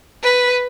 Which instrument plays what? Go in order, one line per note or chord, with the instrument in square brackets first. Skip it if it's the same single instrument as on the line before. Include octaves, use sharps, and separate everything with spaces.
[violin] B4